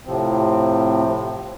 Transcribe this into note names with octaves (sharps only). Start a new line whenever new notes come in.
A2 C3 F3 C4